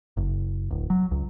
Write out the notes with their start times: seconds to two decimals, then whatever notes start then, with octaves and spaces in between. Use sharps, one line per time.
0.17 F#1
0.71 D1
0.90 F#3
1.11 C#2